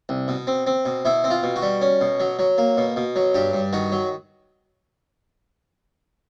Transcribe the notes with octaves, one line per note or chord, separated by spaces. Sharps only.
C2
B2
C4
C4
B2
B2 E4
C4
F4
B2
F#4
G3
C#4
B2
F#3
F#3
A#3
B2
B2
F#3
G2 G4
G2
D#3 F#4
F#3